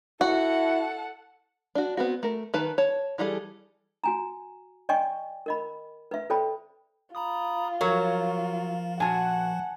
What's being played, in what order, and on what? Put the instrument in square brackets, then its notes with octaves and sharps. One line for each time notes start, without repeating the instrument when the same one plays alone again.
[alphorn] E4 [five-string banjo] F#4 [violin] A4 F#5
[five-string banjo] D4 F#4
B3 C4 F#4
A3 A#4
D#3 B4 A5
C#5 A5
E3 G3 G#4 A4
[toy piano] F#4 G#5 A#5
D5 D#5 G5 G#5 C#6
A#4 D#5 B5
B4 E5
A4 C5 D5 G5 B5
[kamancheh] F4 [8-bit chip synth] A#5 B5 D#6
[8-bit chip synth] F3 [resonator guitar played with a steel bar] F#3 C#5 [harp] A#4
[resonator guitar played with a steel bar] A#2 F#4 [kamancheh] F#5 [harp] G#5 A5